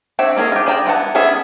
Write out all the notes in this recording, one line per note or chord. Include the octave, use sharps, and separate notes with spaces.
C4 D4 C#5 E5
A#3 C#4 G#4 A#4
F4 G4
G#4 C5 D5 G5 A#5
E3 B3 F4 F#5 A5
B3 C#4 D4 G#4 E5